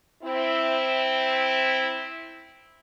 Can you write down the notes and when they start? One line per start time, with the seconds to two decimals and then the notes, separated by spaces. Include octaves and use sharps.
0.23 C4 E4